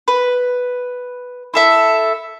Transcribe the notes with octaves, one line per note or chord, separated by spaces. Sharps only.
B4
E4 A4 E5